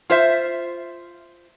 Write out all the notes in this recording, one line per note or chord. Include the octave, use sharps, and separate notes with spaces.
F4 C5 E5